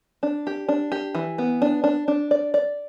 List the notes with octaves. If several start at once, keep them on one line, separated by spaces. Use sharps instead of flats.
D4
G4
D4
G4
E3
B3
D4
D4
D4
D5
D5